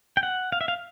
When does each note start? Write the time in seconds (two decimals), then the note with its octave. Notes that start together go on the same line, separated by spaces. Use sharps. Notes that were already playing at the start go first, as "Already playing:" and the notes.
0.17 G5
0.23 F#5
0.52 F5
0.61 E5
0.68 F5